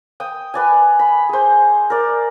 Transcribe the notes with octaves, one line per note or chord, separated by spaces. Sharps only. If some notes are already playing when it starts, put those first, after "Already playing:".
G5 D#6
B4 D5 G#5
B5
G#4 C5
A#4 D5